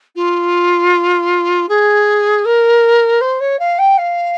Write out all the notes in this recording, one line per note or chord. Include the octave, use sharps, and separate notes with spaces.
F4
G#4
A#4
C5
C#5
F5
G5
F5